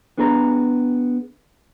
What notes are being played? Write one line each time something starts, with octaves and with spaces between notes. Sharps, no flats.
B3 D4 G#4 B4 A#5